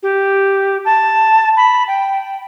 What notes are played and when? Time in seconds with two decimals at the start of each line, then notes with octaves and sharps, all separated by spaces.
0.03 G4
0.85 A5
1.57 B5
1.88 G5